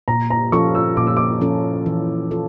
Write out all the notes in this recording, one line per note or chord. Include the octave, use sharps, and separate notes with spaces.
A#2 A#5
A#5
F3 C#4 F4 A4 C#6
E6
A#2 D6
E6
D6
F3 C#4 F4 A4
E3
F4 A4